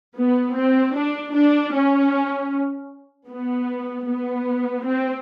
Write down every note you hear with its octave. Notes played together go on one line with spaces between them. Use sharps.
B3
C4
D4
D4
C#4
B3
B3
C4